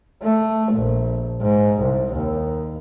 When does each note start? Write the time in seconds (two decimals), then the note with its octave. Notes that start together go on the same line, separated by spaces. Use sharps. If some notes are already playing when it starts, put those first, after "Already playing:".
0.22 A3
0.73 A#1
1.41 G#2
1.80 C2
2.14 D#2